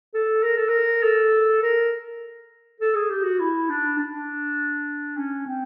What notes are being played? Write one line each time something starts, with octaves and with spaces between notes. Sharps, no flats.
A4
A#4
A4
A#4
A4
A#4
A4
G#4
G4
F#4
E4
D4
D4
C#4
C4